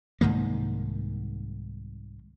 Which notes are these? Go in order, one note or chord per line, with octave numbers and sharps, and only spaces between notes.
C2 G#2 D#3 A#3